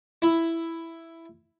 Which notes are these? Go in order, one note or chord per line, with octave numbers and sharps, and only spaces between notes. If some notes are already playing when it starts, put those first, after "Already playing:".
E4